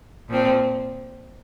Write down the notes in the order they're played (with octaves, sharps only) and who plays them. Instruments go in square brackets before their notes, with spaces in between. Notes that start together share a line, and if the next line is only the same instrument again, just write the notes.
[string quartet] A#2 F3 C4